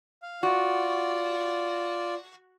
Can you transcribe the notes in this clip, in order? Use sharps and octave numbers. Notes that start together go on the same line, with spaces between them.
F5
F4 F#4 D5